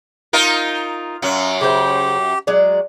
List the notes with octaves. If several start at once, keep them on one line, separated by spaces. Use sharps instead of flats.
D#4 F4 A#4
F#2 F#3 F5
C#3 G4 C5
F#3 G#3 D5